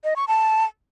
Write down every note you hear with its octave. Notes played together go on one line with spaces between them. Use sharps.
D#5
C#6
A5